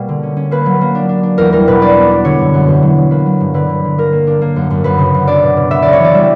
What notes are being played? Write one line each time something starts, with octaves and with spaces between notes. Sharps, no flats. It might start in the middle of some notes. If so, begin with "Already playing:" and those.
Already playing: B2 G3 A#3
D3
C#4
C#4
A#3 B4
F#3
A#3
D4
D4
D4
E2 A#4
G3 A#4
B2 B4
D4 D5
B3
D4
D3 C#5
F#2
F#2
E2
F#3
F#3
A#3 B4
F#3
G2
D3 B4
D3
D3
A#3 A#4
A#3
D4
A#3
F#2
F#2
F#2 B4
C#3
F#2
D4 D5
B2
B2
B3 E5
C#3 D5
C#5
E3 D5
G3 E5